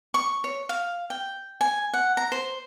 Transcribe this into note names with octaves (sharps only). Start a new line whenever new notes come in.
C#6
C#5
F5
G5
G#5
F#5
A#5
C5